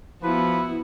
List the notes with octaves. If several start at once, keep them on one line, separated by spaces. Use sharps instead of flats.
F3 B3 E4 F#4 B4